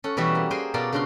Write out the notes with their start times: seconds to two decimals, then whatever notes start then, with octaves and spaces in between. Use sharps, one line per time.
0.04 C#4 A4 F#5
0.17 B2 E3 G3 F#4 E5
0.35 A#3
0.51 G#4 A#4 C5 G5 G#5
0.74 B2 F4 A#4 D5 A5
0.93 C#3 D4 F#4 A#5 C6